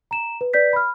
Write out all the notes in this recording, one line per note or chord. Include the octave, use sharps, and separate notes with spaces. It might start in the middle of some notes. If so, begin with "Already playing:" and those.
A#5 E7
B4
B4 D5 G6 B6
B5 F6